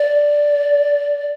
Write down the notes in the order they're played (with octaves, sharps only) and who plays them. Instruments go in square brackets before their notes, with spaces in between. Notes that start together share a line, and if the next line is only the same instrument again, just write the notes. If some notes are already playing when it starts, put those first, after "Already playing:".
Already playing: [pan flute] D5